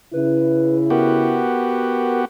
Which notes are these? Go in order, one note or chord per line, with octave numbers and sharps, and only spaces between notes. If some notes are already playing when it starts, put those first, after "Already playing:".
C#3 E4 B4
B3 F#4 G4 A#4